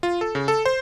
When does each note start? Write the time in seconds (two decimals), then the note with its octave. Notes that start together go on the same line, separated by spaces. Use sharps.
0.03 F4
0.21 A4
0.35 C#3
0.48 A4
0.66 C5